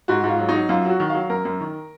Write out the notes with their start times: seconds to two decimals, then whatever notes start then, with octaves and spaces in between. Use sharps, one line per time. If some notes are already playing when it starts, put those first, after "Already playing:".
0.08 G#2 F#4
0.24 G#2 F4
0.39 F#3
0.49 D#4
0.54 F#3
0.69 F#2 F4
0.85 F#3 F#4
1.00 D#3
1.10 F5
1.15 F#3
1.30 F#2 A#4
1.45 F#2
1.60 D#3